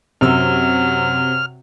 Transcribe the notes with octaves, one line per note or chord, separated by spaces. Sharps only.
F#2 C3 F#3 E6 F6